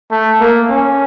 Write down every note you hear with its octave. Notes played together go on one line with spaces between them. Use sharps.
A3
A#3
C#4